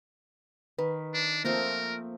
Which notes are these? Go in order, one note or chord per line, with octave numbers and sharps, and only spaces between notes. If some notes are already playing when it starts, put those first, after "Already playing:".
D#3 B4
D4
F3 A3 A#3 C4 A#4